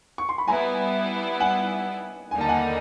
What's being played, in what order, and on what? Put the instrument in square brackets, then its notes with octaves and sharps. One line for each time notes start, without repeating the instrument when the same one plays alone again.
[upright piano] C#6
C6
B5
[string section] G3 B3 E4 [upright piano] G#5 A#5
[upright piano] F#5 G#5
[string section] D#2 D3 G3 A#3 D#4 [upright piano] G#5
[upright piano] A5
F#5 G#5